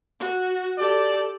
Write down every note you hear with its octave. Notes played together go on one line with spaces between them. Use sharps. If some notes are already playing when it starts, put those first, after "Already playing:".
F#4
G4 A4 D5